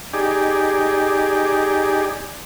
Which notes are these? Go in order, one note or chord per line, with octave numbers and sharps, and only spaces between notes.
D#4 G4 G#4 D5